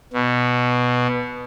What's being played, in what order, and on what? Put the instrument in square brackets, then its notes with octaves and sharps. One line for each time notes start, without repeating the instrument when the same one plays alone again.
[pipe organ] B2